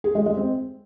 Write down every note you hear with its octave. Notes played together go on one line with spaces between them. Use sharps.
G#4
G#3
G#3
C4